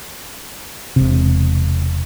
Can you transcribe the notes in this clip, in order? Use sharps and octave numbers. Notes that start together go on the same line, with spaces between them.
E1 C3